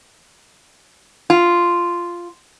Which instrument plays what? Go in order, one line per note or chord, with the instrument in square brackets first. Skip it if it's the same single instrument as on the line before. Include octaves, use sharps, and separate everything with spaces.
[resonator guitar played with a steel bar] F4